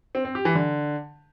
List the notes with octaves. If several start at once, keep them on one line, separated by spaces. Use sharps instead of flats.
C4
C4
G4
E3
D3